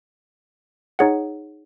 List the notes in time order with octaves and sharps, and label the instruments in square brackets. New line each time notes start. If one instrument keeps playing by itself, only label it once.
[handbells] D#4 G#4 C#5 F#5